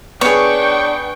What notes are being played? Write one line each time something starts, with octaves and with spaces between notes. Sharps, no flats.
B3 D4 G#4 C#5 G5 C#6